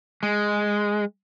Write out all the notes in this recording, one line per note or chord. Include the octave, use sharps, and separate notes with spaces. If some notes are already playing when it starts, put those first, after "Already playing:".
G#3